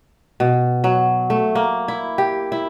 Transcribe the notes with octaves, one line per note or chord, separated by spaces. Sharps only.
B2
F#3
A3
A#3
E4
G4
E4